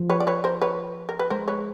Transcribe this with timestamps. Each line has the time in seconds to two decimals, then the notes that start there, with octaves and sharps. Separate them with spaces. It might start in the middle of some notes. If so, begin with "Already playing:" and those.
Already playing: F3
0.10 B4 C#5
0.20 D5
0.27 B4 C#5
0.44 A#4 C5
0.62 B4 C#5
1.09 A#4
1.19 B4
1.30 G#3 A#4 C5
1.48 B4 C#5